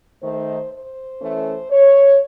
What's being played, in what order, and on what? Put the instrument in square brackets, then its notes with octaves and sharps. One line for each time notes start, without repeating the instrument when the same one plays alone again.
[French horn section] D#3 A3 D#4 C5
C5
E3 A3 C#4
C#5